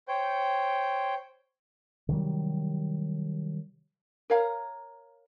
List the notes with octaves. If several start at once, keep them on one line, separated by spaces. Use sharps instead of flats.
C5 C#5 G5 G6
C3 D#3 F#3 G3
A#4 C#5 F5 A#5